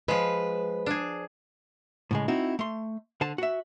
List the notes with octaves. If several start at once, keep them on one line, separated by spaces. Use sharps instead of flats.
F3 G#3 B4
D4 G#4
A2 C#3 G#3
C4 D#4 E4 F#4
A3 C6
D3 C5 A5
F#4 E5